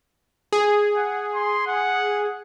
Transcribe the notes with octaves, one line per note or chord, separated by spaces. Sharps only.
G#4
F#5
C6
F#5